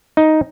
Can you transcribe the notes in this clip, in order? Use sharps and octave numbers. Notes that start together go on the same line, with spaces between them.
D#4